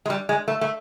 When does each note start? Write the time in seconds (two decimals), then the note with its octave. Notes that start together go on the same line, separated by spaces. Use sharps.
0.06 G#3
0.10 G3
0.29 G#3
0.48 A3
0.61 A3